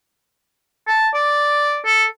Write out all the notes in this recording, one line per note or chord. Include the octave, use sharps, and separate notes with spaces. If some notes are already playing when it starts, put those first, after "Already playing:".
A5
D5
A4